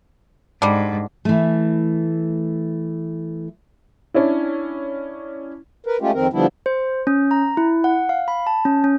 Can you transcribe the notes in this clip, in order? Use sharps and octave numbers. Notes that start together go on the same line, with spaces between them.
G#2 D3 G3
E3 A3
C#4 D4 E4
A#4 B4
G#3 A3 C#4 F4 G4
F2 D#3 C4 A#4
D3 F3 G3 B3 D4 E4
C5
C#4
A#5
E4
F#5
F5
B5
A5
C#4
C#4